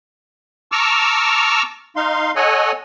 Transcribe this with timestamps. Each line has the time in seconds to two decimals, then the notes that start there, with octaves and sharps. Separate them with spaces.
0.72 A5 A#5 C#6 D6 E6 F6
1.96 D#4 F5 C6
2.36 A4 C#5 D#5 F#5 G#5